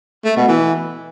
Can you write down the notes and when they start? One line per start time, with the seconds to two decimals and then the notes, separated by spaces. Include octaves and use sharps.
0.25 A3
0.36 B2
0.48 E3